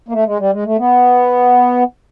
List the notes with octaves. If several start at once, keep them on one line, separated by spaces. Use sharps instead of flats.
A#3
A3
G#3
G3
G#3
A3
B3